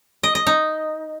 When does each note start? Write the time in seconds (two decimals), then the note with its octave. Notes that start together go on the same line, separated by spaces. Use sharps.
0.23 D#5
0.35 D#5
0.47 D#4